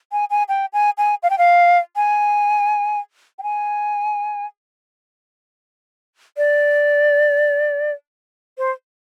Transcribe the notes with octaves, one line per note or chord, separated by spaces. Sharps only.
G#5
G#5
G5
G#5
G#5
F5
G5
F5
G#5
G5
G#5
D5
C5